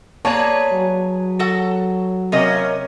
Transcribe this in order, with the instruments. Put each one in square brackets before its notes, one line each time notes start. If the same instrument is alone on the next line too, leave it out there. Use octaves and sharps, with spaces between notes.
[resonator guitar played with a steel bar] A#3 D5 A#5 [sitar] G#4 B4 C#5 [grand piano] A5
[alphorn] F#3
[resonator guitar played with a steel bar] F#4 A4 F#5
[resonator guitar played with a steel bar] C3 A#4 D#5 [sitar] A#3 C#4